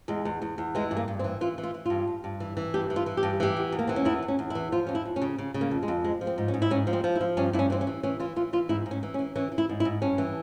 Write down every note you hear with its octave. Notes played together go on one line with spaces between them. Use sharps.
E2 G#3
E2
E2
E2
E3 G#3
G2
A#3
G2
C4
E3
E3 F4
E3
F4
E3
G2 F4
G2
G2
E3
E3
G2 G4
E3
F4
E3
G4
G2
E3 G4
E2
E2
A#3
E3 C4
C#4
E2 E4
E2
C#4
E2
E4
E3
F3 F4
F2 C#4
E4
F2
C#4
C#3
C#3
C#3
A#3
F2
G#3
F2
F3 G#3
F3
C4
G#2
C#4
G#2
E4
G#2 C#4
F3
C4
F3
E4
F3
G2 C#4
G2 E4
C#4
E3 C4
C#4
E3
E3 C#4
E3 F4
E3 F4
E3 F4
G#2 E4
G#2
C#4
E3
C#4
E3
E3 C#4
E3
E4
G#2
E4
G#2
G2 C#4
E3